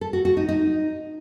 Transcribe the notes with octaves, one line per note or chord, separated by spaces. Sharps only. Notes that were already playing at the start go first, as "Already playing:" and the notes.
A4
F#4
F#4
D#4
D#4